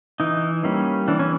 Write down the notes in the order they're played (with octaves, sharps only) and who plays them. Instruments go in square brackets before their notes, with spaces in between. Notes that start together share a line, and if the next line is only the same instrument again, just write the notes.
[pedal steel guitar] E3 D#4
G3 A#3 C#4
E3 D4
C#4